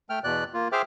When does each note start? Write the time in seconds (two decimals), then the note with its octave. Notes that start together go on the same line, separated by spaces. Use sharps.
0.10 A3 G5 F6
0.24 E2 B2 D5 F#6
0.54 A#3 F4
0.72 G#4 C5 E5 G5 D6 F6